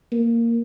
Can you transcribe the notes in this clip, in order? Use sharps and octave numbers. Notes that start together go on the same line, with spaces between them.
A#3